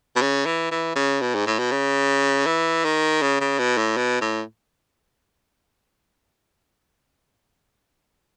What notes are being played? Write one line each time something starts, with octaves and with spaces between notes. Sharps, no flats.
B2
C#3
E3
E3
C#3
B2
G#2
A2
B2
C#3
E3
D#3
C#3
C#3
B2
A2
B2
A2